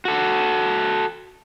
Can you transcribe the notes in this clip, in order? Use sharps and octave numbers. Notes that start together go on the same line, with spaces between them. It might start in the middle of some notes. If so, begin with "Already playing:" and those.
F#4 A4